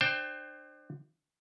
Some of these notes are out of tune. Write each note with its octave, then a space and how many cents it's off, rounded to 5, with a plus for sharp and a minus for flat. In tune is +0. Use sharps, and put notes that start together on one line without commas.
D4 +35 C5 +15 G5 +0